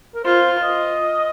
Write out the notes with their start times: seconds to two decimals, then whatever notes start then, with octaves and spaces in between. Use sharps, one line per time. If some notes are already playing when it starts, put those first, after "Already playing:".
0.15 A#4
0.24 F4 C5
0.63 D#5